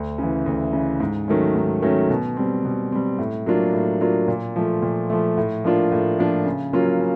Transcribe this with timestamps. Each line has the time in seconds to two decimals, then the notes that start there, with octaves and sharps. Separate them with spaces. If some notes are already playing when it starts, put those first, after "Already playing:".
Already playing: D2
0.18 C#3 E3
0.46 D2
0.73 C#3 E3
1.00 G#2
1.28 D#3 F#3 A3 C#4
1.56 G#2
1.82 D#3 F#3 A3 C#4
2.10 B2
2.37 G3 C4
2.65 B2
2.92 G3 C4
3.19 A2
3.46 F#3 A#3 D4 F4
3.73 A2
4.01 F#3 A#3 D4 F4
4.28 A#2
4.56 F3 A3
4.82 A#2
5.10 F3 A3
5.37 A2
5.64 F3 A#3 D4 F4
5.92 A2
6.19 F3 A#3 D4 F4
6.46 C#3
6.73 F#3 A#3 C#4 F4
7.00 C#3